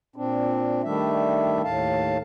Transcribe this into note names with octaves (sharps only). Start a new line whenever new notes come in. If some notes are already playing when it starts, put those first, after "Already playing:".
A#2 C4 D4
D#3 G3 A3 D4 E5
D#2 A2 F5 A5